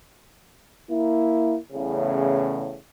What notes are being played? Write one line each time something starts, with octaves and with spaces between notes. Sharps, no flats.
A#3 E4
E2 A2 C#3